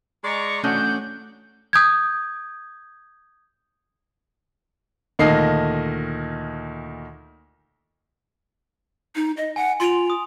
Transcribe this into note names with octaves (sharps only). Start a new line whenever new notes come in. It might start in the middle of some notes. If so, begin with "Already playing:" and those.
G#3 D5 A#5 C#6
F#3 A3 C#4 D4 D#5 F#5 G6
D#6 G6 G#6
D2 A#2 D#3 A4 D#5 C7
D#4
D#5
F#5 G#5
F4 C6 D7 F7
D#6